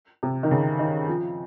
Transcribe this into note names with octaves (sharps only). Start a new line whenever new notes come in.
C3
D#3
C#3
D#3
F3